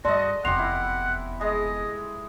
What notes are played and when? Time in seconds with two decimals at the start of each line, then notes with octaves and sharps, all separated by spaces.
0.05 G2 F#4 A4 D5 D#5 C6
0.45 F1 E2 G4 F#5 C6 F7
0.59 E4
1.41 G#3 D#5